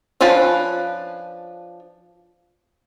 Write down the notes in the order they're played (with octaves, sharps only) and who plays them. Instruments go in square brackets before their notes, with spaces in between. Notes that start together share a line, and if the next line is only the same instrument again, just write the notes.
[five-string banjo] F3 C#4 D4 F4 B4